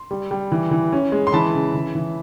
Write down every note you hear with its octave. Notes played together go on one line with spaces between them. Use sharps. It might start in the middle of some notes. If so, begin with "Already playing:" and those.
Already playing: C6
G3
G3
E3
E3
C#4
G#3
C6
E3 A5 B5
C#3
E3
E3